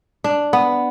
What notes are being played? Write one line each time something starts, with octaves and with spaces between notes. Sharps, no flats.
D4
B3